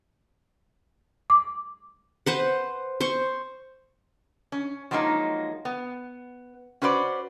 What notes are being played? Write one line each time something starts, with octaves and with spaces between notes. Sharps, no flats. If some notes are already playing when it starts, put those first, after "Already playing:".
D6
B4 C5 F#5
C5 C6 C#6
C#4
F3 F#3 G#3 A#3 D#4
B3
C#4 F#4 B4 C5 D5